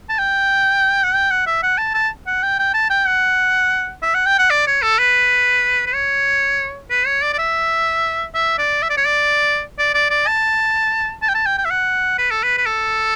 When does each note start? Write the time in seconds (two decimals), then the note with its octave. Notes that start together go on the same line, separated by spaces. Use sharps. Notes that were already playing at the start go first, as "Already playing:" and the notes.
0.09 A5
0.19 G5
1.04 F#5
1.15 G5
1.31 F#5
1.47 E5
1.63 F#5
1.78 A5
1.94 A5
2.27 F#5
2.43 G5
2.59 G5
2.74 A5
2.90 G5
3.06 F#5
4.03 E5
4.14 F#5
4.26 G5
4.39 F#5
4.50 D5
4.67 C#5
4.82 A4
4.99 B4
5.86 B4
5.94 C#5
6.90 B4
7.06 C#5
7.22 D5
7.33 D5
7.38 E5
8.34 E5
8.58 D5
8.82 E5
8.90 D5
8.97 C#5
9.06 D5
9.79 D5
9.94 D5
10.10 D5
10.27 A5
11.22 A5
11.29 G5
11.34 A5
11.46 G5
11.58 G5
11.65 E5
11.70 F#5
12.18 B4
12.31 A4
12.44 B4
12.57 B4
12.66 A4